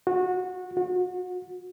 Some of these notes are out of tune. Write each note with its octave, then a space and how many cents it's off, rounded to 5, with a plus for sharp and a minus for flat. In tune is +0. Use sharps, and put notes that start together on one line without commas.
F#4 -20
F#4 -30